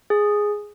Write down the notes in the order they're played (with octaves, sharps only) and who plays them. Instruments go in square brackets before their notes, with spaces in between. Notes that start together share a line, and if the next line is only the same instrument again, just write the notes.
[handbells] G#4